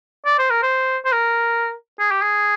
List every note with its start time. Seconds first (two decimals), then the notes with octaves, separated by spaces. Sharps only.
0.25 D5
0.38 C5
0.50 A#4
0.63 C5
1.05 C5
1.12 A#4
1.99 G#4
2.11 G4
2.22 G#4